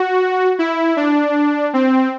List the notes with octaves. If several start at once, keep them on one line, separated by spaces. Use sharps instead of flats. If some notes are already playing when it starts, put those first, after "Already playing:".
Already playing: F#4
E4
D4
C4